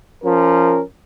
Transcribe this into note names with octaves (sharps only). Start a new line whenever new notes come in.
F3 C#4 A#4